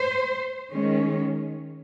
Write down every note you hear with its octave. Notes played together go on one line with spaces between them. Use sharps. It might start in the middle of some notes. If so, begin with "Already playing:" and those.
Already playing: C5
D#3 G#3 C#4